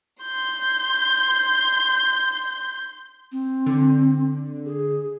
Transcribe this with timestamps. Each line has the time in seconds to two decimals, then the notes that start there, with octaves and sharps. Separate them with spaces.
0.23 C6 G6
3.32 C4
3.66 D3
4.66 G#4